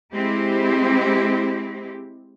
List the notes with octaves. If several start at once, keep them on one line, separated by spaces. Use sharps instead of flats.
G#3 C4 E4 G4